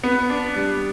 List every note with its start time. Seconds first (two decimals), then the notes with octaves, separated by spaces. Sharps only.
0.03 B3
0.30 D4
0.56 G3